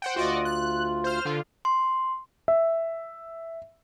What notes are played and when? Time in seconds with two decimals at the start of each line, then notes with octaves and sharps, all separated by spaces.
0.02 C5 F#5 G5
0.16 D2 F4 F#4 D5 D#5
0.45 F#6
1.04 C5 F6
1.25 D3 F4
1.65 C6
2.48 E5